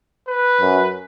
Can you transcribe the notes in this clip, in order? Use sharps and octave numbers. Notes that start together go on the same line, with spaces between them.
B4
F#2